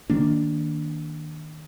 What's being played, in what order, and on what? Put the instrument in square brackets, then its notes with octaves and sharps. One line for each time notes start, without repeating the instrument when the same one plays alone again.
[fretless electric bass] D#3 A#3 D4